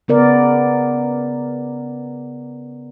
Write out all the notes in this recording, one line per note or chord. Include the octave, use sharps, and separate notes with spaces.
C#3 B3 A#4 D5